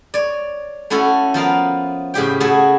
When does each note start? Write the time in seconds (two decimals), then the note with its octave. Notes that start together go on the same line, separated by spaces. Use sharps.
0.14 C#5 D5
0.90 A3 C#4 E4 F#4 A4
1.34 F3 B3 A#4 F5
2.14 A2 C#3 G4 G5
2.40 A3 E4 F#4 G#4 A5